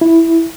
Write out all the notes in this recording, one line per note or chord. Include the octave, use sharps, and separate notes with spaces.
E4